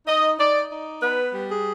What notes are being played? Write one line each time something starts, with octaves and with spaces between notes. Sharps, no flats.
D#4 D#5
D#4 D5
D#4
B3 B4
G3
G#4